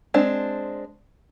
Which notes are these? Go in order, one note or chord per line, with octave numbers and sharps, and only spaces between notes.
G#3 C4 D4